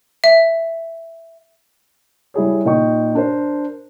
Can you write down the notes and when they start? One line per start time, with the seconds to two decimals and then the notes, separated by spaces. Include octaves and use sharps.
0.24 E5
2.34 G3 E4 G#4 C#5
2.65 A#2 D#4 D#5 G5 C#6
3.15 D4 A#4 C5